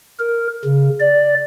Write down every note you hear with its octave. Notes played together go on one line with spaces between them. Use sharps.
A#4
C#3
D5